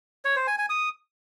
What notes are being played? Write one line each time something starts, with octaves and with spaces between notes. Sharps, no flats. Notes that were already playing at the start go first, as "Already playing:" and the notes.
C#5
C5
G#5
G#5
D#6